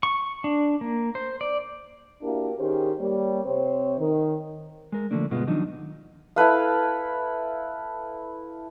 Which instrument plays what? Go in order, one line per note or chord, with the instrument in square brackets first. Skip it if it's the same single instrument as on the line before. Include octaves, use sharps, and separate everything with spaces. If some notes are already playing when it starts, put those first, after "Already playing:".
[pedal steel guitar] C#6
D4
A#3
C5
D5
[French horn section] A#3 D4 E4 F#4 G4 A#4
D#3 C#4 G4 G#4 A#4 C5
G3 A#3 C#5
C3 C4 C5 C#5
D#3
[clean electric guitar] G#3 A#4
D3 F3 A3 A#3 D4
D2 G2 B2 G#3 B3 F4
D#3 F3 F#3 D4 D#4
[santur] E4 A4 B4 F5